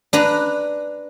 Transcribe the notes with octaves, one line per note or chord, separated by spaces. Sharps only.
D4 B4 A#5